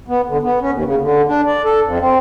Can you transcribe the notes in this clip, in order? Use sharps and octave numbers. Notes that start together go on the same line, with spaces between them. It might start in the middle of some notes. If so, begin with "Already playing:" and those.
B3
D3
B3
C#4
D#2
C#3
D3
D4
D5
A4
F2
C4